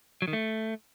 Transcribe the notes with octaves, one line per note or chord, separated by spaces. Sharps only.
F#3
D#3
A3